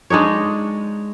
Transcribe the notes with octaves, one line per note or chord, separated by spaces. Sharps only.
G#3 D4 D#4 C#5